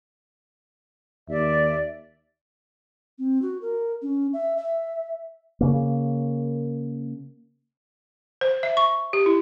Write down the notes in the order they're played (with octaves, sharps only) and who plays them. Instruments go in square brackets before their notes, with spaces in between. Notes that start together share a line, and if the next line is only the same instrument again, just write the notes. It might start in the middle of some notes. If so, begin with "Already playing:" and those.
[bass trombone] D#2 [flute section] D5 E5
[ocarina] C4
F#4
A#4
C#4
E5
E5
[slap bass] C#3 A#3
[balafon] C5
E5
C#6
G4
E4